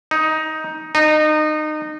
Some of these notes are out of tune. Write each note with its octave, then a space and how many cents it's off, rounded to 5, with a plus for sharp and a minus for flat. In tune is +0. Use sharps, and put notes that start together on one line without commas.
D#4 +10
D#4 -25